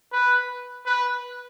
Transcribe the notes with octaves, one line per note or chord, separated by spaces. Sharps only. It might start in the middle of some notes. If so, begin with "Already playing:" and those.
B4
B4